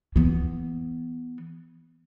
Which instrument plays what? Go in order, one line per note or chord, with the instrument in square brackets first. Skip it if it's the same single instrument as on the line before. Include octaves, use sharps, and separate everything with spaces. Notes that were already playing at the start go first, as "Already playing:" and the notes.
[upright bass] E3 B3